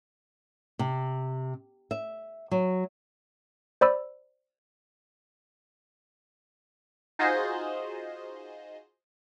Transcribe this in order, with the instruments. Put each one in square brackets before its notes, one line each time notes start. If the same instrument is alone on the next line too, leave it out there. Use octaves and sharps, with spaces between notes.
[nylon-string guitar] C3
E5
F#3
[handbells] C5 D5 B5 E6
[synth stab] D#4 F4 F#4 G#4 C5 D#5